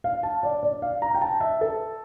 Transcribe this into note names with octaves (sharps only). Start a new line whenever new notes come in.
F5
A5
D5
D5
F5
A#5
G5
A5
E5
A4